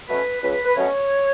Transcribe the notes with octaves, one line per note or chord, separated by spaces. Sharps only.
B2 F#3 A3 C#4 B4
C#2 B4
B4
B2 F#3 A3 C#4 C#5